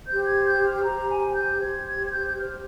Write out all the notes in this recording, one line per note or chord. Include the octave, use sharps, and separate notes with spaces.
G4 C5 G6
G#6
G6
F6
G4 C5 A#5
G#5
G6
G4 C5 G#6
G#6
G#6
G6
G6
G4 C5 F6